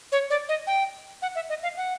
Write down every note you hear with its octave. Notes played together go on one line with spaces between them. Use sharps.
C#5
D5
D#5
G5
F#5
E5
D#5
F5
F#5